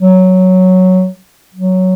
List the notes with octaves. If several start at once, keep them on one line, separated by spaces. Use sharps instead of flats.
F#3
F#3